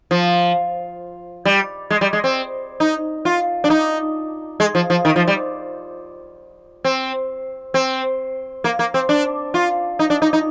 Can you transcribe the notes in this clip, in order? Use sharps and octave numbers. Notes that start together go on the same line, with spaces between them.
F3
G3
G#3
G3
G#3
C4
D#4
F4
D4
D#4
G#3
F3
F3
D#3
F3
G3
C4
C4
A#3
A#3
C4
D4
F4
D#4
D4
D#4
D#4